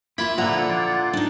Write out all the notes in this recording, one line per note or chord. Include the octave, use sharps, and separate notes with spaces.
A#3 E4 F4 E5 B5
A#2 D3 F3 E4 F#5 A#5
F4 D5
D4 D#4